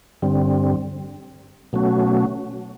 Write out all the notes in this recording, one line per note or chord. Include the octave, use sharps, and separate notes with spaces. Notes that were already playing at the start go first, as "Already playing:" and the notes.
G2 D3 G3 C4
B2 F#3 A3 C#4 F#4